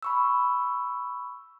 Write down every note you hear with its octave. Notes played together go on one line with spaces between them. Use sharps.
B5 C#6 E6